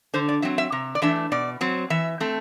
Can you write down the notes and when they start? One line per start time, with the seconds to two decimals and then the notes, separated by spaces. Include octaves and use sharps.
0.14 D3 C5
0.29 D5
0.42 F#3 C4 E5
0.58 E5
0.72 C3
0.95 D5
1.02 E3 A3 D4 E5
1.32 B2 D5
1.61 F#3 C4
1.90 E3 E5
2.20 A3 C4